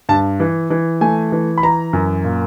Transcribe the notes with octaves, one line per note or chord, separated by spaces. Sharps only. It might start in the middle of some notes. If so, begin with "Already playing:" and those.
G2 A5
E3
E3
A3 G#5
E3
B5
E3 A#5
F#2
A#2